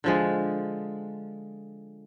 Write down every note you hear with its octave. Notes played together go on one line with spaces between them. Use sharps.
D3 F3 G#3